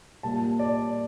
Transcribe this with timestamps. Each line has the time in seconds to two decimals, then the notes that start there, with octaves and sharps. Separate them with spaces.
0.23 A#2 G3 A#3 A5
0.59 D5